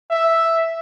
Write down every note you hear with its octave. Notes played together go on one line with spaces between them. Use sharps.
E5